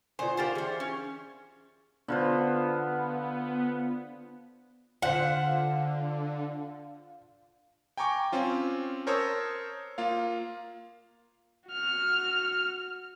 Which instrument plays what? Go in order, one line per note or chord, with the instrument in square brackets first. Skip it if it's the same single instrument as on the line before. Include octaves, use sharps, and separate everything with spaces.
[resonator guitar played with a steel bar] B2 C5 [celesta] F4 D5 G#5
[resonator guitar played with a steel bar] A#3 G4 C5 [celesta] G#5 A6
[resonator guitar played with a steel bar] E3 C5 [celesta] G#4
[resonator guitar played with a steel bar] C#4
[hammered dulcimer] D3 F4 C5 [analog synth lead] B3
[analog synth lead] D3 [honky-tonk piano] F4 C5 B6 [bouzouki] F#5
[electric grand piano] G5 G#5 A#5 C#6 D6
C4 C#4 F4
A#4 C5 C#5 A5 D#6 E6
A#3 F4 F5
[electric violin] F#4 F6